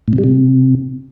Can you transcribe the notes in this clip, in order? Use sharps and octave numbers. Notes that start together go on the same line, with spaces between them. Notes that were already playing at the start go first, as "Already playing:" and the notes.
A2
C3
G3
C3